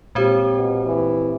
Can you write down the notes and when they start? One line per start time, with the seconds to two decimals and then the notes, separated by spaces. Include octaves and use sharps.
0.15 A#2 G#3 C4 G4 C5
0.56 B2
0.86 E3